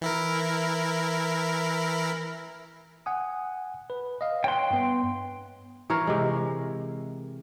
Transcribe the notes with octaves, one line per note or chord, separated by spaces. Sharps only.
E3 E4 A#4
F#5 G#5 D#6
B4
D#5 F5
C#5 G5 C6 F#6
G2 B3
E3 A#4 C#5 F5
C3 G#3